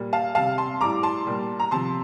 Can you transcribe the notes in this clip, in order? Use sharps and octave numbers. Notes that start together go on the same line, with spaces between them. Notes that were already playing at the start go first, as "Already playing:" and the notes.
Already playing: A#2 G3
F5 A5
C3 G3 F5 A5
A5 C6
A2 G3 A#5 D6
A5 C6
A#2 G3
A#5
C3 F3 A5 C6